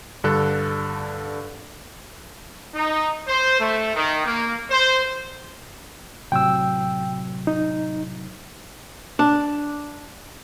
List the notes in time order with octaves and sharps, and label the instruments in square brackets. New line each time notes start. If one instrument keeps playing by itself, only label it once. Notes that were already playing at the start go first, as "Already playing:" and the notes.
[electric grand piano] G2 D3 A4 F#6
[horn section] D#4
C5
A3
D#3
A#3
C5
[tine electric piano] A2 C3 F#3 [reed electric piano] G5 E6
[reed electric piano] D#4
[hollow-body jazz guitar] D4